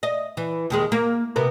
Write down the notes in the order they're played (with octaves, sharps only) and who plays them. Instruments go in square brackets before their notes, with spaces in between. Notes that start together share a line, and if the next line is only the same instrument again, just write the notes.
[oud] D#5
E3
D#2 D#3 G#3
A#3
C3 B3 A#4